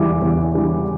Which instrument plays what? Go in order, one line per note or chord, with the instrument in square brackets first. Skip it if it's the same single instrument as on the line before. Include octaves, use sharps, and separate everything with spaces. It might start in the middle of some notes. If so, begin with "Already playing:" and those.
Already playing: [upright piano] E2 E3 G3 D6
E2
E3 G3